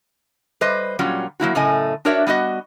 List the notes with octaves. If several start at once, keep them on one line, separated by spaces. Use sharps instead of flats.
G3 B4 C5 D#5
A#2 F#3 G3 C#4 F4
F#3 A#3 E4 F#4
F#2 A2 C#3 A3 D#5 G#5
D4 F#4 A#4 C#5 D5 E5
G3 B3 F#4 D#5